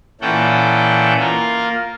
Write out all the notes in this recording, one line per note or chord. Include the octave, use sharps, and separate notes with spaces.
A#2 E3 C#4 A4 F#5 G5
A#3 F4 A#4